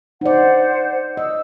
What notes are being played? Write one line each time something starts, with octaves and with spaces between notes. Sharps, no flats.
D#4 C5 D5 F#5
D#5 E6